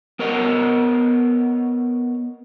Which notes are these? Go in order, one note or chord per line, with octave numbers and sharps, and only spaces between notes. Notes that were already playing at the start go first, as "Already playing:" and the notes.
B3 A#4 C#5 D#5 F#5